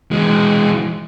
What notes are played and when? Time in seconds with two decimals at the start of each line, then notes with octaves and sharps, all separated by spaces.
0.11 E3 G#3